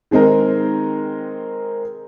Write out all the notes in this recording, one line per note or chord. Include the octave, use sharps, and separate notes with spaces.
D#3 G#3 C4 D#4 A#4